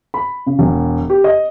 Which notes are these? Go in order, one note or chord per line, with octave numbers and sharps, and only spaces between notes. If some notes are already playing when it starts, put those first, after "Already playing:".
B5
C#3
E1
G4
D#5